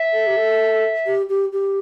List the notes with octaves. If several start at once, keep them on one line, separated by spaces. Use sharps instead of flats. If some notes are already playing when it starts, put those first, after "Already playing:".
Already playing: E5
A4
G4
A4
G4
G4
G4